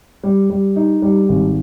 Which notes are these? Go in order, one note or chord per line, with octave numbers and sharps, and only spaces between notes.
G3
G3
D#4
G3
G#1